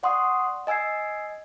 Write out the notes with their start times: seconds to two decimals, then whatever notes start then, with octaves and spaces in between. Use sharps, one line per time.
0.03 D5 F#5 C6 C#6 D#6
0.67 D#5 G#5 E6 G#6 C7